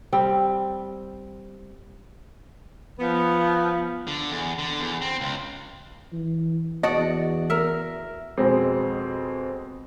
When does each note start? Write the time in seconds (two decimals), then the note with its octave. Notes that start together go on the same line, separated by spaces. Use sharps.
0.13 G3 C4
2.99 F3 B3
4.07 D3
4.30 E2
4.59 D3
4.81 E2
5.02 C4
5.21 C#2
6.12 E3
6.83 E2 F#4 D5 D#5 F#5 A5
7.50 A#4 E5
8.38 F2 B2 G#3 C4